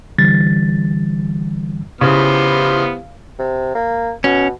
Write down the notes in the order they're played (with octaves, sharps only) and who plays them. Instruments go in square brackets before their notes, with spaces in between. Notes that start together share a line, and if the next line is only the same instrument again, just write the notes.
[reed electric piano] D3 E3 G3 A6
[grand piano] C#3 [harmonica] B3 C5 F6 [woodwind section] E4 G4
[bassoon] C3
A#3
[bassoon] B2 [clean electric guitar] C#4